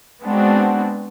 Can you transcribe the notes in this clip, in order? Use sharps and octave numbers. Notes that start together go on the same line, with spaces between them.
G#3 B3 C4 D4 F#4